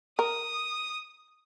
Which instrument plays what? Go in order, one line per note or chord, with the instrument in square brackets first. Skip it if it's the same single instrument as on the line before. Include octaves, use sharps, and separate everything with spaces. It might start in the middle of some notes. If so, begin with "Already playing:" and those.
[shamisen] A#4 [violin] D#6